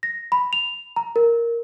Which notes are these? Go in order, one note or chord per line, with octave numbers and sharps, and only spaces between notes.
A#6
B5
F7
A#5
A#4